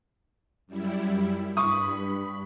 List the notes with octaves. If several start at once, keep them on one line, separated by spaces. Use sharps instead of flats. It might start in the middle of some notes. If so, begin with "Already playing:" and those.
F#2 G3 E4
G2 B5 C#6 D#6